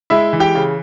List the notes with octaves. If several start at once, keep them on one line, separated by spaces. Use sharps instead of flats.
G#3 E4 E5
E3
G4 G5
C#3